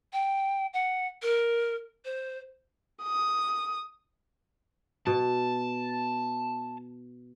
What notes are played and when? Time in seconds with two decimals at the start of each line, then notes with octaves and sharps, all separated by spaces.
0.13 G5
0.73 F#5
1.22 A#4
2.05 C5
3.03 D#6
5.07 B2 A5